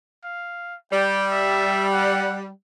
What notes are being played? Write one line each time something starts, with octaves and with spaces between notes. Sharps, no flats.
F5
G3 G5
E5
F#5